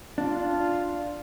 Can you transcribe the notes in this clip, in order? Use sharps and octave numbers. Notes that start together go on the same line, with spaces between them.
D4 F4